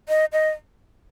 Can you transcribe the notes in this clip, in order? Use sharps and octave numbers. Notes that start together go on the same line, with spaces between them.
D#5
D#5